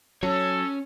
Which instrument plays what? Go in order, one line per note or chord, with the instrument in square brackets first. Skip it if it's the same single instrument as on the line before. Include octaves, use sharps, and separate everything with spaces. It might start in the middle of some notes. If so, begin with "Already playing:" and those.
[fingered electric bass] F#3 [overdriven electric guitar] C#4 C#5 [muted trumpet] A4